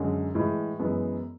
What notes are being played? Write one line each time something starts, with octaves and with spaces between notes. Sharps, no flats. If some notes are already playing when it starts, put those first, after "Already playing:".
Already playing: F#2 D3 G#3 C#4
A2 E3 G#3
F#2 E3 G#3 B3